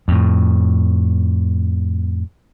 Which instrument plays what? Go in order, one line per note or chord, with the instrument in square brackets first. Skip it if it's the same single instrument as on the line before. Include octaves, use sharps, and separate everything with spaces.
[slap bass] F2 A2